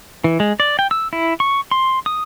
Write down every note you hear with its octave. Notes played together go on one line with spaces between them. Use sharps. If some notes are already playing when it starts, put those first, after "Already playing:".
E3
G#3
D5
G5
E6
E4
C#6
C6
D#6